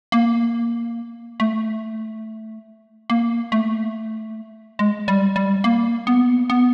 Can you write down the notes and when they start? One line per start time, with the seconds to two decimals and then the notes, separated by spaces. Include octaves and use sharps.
0.12 A#3
1.40 A3
3.10 A#3
3.52 A3
4.79 G#3
5.08 G3
5.36 G3
5.64 A#3
6.07 B3
6.50 B3